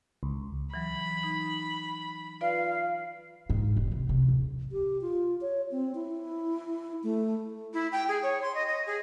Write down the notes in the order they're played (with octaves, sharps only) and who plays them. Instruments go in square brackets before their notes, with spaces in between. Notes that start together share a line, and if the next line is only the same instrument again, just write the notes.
[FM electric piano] C#2
[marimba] E3 F#3 [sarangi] B5
[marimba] D#4
[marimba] F4 B4 D5 [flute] F5
[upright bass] G#2
F1
C3
C3
D1
[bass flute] G4
F4
C#5
C4
E4
A3
[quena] E4
G5
G#4
C#5
C6
D#5
D#5
G#4